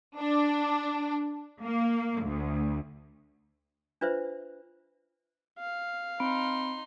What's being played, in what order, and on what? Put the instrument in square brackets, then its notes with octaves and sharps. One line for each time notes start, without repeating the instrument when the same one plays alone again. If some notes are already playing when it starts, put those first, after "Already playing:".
[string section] D4
A#3
D2
[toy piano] D4 F4 B4 C5 E5
[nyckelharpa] F5
[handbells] C4 B5 D7 [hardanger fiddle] D#4 C6